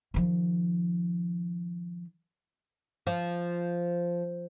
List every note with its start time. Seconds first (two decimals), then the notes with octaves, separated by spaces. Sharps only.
0.14 D#3 F3
3.07 F3